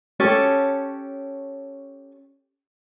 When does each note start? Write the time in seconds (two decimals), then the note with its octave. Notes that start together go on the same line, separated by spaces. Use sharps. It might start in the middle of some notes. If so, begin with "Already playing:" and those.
0.20 C#4 G4 A4 C#5